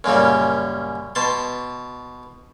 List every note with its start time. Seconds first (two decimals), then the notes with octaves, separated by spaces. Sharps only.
0.04 F#2 A#2 C#3 G3
1.15 B2 A5 C6